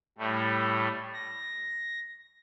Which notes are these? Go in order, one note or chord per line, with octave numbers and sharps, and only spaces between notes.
A2 G3 A3
A#6